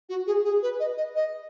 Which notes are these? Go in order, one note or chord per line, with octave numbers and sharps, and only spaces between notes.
F#4
G#4
G#4
B4
D#5
D#5
D#5